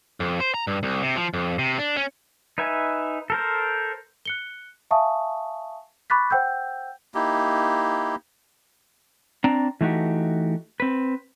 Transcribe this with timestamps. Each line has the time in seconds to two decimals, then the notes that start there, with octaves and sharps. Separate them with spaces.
0.20 F2
0.40 C5
0.54 A#5
0.67 G2
0.83 C2
1.03 C3
1.16 F3
1.34 F2
1.59 C3
1.79 D4
1.97 C#4
2.58 D#4 B4 E5 G#5
3.30 A4 A#4 C5
4.25 F#6 C#7 G7
4.91 E5 F5 G#5 A5 C#6 D#6
6.10 B5 C#6 D6 F#6 A6 B6
6.31 C5 F#5 G5 E6 G6
7.15 A#3 D#4 E4 G4
9.44 C4 D4 D5 A#5
9.81 E3 A3 D#4 F#4 G4
10.80 C4 B4